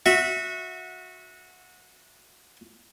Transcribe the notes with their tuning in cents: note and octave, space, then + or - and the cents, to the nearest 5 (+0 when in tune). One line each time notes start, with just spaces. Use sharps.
F#4 -20 E5 -10